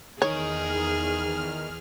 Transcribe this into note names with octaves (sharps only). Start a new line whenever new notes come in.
E2 D#3 D#4 G#4 C#5 F6